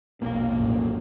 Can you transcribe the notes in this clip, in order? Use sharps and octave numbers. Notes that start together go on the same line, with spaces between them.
E1 A#1 B2 A#3 A#4
A1 F#2